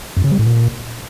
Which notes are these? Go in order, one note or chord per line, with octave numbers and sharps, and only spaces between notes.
F#2
C#3
G3
A2
A#2